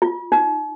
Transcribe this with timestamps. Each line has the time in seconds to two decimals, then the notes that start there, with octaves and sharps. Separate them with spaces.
0.02 F4
0.32 D#4